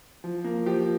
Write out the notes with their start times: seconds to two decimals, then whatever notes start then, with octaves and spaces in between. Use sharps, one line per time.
0.24 F3
0.44 A#3
0.66 F3 G4